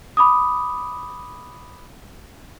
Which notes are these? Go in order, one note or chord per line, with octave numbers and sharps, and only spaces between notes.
B5 D6 D#6